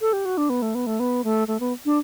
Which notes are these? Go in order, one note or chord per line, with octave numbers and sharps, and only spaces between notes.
A4
G4
F#4
D4
B3
A3
B3
A3
B3
A3
A3
B3
D4